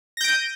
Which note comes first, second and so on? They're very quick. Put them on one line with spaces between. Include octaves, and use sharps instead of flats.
A#6 G6 D7 D#7